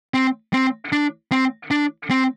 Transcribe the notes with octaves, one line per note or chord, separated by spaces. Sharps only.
C4
C4
D4
C4
D4
C4